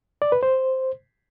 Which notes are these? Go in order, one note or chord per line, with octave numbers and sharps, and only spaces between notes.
D5
B4
C5